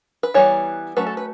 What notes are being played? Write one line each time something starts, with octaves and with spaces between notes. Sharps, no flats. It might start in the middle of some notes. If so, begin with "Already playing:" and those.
B4
E3 G3 B3 C#5
F#3 A3 C#4 B4
A4
B4